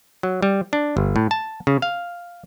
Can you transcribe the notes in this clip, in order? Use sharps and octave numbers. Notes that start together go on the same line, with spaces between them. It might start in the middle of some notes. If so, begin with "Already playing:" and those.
F#3
G3
D4
G1
A2
A5
C#3
F5